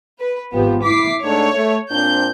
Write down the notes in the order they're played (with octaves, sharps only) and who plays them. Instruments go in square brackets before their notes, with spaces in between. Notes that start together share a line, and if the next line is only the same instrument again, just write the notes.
[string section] B4
[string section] G#1 B3 [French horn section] F3 G4
[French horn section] E4 [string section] D6 B6 C7
[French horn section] G#2 A3 D4 [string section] C#5
[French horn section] A3
[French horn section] A#2 C4 D4 [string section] G6